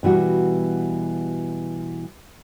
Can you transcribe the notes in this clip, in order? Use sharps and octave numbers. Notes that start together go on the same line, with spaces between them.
B2 E3 G3 F#4